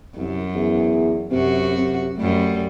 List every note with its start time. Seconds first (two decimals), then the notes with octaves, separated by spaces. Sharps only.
0.16 C2 F#2
0.55 E2
1.31 F#2 C3 F#4
1.78 C3
2.17 F#2 G3 A3